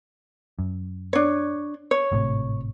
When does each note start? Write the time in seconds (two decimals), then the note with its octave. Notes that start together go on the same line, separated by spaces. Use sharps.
0.59 F#2
1.13 D4 C#5
1.91 C#5
2.12 G#1 A2 C3